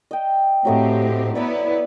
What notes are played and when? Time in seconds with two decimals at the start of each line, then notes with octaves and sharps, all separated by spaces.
0.11 D#5 G5
0.65 A2 F#3 A3 C4 G4 D#5
1.35 B3 E4 B4 D5 A#5 B5